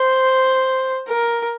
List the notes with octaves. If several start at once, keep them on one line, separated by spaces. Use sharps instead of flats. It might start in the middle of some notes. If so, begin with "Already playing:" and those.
Already playing: C5
A#4